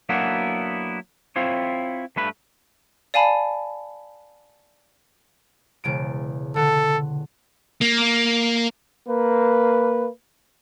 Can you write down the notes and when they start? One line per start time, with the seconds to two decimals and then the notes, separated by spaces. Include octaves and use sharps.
0.09 F#3 A#3 B3 D4 E4 F#4
1.36 C4 E4 F4 C5 C#5
2.16 G2 A3 B4 B5
3.14 D5 F5 G#5 A5 B5
5.84 E1 C#3 D7
6.56 D3 A4
7.82 A#3
9.07 A#3 B4